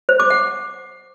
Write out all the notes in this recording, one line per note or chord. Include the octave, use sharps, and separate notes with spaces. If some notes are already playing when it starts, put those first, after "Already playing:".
C5
D6
F#5